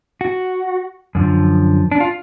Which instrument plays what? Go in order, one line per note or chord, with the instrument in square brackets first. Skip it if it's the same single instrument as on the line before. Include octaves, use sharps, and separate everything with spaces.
[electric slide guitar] F#4
F#2 D3 F3
D4
F4